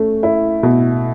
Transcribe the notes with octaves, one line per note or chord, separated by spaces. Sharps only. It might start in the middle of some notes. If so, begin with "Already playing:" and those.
Already playing: A3 C#4
E4
B2